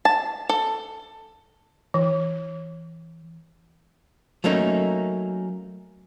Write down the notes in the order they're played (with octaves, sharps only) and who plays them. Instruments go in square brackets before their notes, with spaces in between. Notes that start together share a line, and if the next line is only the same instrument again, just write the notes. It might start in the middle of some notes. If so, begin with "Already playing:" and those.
[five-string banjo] A5
A4
[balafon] E3
[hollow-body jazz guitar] F#3 A3 A#3 C#4 D#4